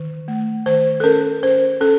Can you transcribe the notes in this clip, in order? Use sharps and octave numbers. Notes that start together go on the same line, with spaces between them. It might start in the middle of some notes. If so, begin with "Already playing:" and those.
Already playing: D#3
A3
D#3 C5
A4
C#4 A#4
C#4 C5
C#4 A4